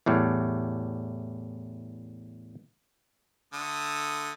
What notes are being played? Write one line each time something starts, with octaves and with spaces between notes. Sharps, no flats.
E2 A2 G3
D3 A3 D#6